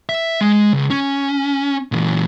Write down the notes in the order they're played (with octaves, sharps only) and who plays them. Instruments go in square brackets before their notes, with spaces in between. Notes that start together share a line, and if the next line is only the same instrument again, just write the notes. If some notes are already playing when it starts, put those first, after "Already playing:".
[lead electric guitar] E5
G#3
C#2
C#4
A#2 E3